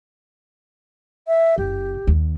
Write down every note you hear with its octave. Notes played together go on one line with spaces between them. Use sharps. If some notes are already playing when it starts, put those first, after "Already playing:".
E5
F#1 G4
D#2